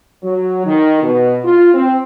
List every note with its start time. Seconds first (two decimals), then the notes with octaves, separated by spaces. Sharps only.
0.23 F#3
0.65 D#3
1.01 B2
1.44 F4
1.74 C4